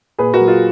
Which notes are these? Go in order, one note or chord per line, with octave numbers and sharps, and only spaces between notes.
A#2 G#4 B4
F#4 A#4
F#3
F4 G#4